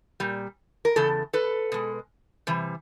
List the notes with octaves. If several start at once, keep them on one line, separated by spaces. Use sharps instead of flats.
A#2 G3
A#4
E2 C#3 A4
A4 B4
B2 G#3
C3 E3 G3